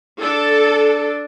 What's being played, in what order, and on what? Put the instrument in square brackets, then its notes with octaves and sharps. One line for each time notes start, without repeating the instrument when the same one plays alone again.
[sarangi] D4 [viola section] A4